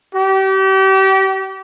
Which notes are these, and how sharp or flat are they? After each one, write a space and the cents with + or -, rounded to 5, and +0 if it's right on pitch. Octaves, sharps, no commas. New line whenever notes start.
G4 -35